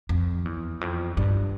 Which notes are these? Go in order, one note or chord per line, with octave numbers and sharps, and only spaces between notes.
F2
E2
F2
G2